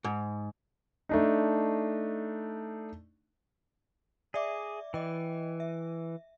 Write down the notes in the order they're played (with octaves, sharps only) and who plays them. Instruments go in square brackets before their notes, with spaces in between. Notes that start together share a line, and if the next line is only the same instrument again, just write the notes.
[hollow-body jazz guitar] G#2
[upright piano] A3 D4 D#4
[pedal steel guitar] G#4 [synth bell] D5 E5 D6
[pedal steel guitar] E3 [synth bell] D#5 G5
[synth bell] E5